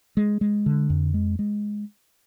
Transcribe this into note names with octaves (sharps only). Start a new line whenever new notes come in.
G#3
G#3
D3
F2
G#3
G#3